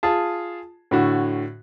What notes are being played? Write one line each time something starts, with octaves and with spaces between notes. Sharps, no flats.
F4 G#4 A5
A2 D3 F#4